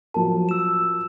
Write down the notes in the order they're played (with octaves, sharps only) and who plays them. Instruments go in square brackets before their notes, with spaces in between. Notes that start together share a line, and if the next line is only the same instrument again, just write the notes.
[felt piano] F3 F#3 A#4 [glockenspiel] A5
[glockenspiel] E6 E7